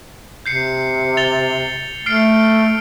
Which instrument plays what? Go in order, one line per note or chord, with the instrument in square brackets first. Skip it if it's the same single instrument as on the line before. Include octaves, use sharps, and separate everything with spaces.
[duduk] C3 [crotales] G6 C7 C#7
[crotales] A6 F7 G7
[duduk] A3 [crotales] F6 C7 D7